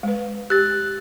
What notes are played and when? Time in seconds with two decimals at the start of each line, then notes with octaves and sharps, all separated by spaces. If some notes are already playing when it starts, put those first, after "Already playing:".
0.03 G#3 B4
0.50 G4 F#6 A6